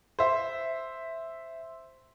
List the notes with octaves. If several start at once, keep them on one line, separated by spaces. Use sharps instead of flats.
C5 E5